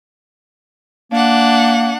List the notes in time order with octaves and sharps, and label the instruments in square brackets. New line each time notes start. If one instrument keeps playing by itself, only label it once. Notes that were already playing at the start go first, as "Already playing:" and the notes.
[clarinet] A#3 [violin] D4 F#5